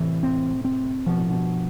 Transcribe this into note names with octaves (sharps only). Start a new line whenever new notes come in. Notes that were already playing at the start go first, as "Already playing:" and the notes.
Already playing: A2 C3 E3
C4
C4
B2 F3
A2
G2 B2